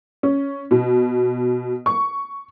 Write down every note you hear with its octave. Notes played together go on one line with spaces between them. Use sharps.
C#4
B2
C#6